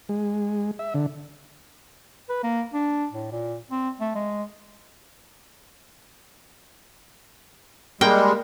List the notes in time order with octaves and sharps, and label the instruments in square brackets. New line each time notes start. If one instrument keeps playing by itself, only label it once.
[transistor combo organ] G#3
E5
D3
[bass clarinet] B4
A#3
D4
A2
A#2
C4
A3
G#3
[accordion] G3 G#3 [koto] A#3 G5